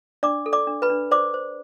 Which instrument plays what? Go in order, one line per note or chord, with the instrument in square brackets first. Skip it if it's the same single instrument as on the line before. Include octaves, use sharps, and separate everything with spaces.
[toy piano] D4 D5 D6
A4
D5 D6
D4
B4 B5
D4
C5 D5 D6
C5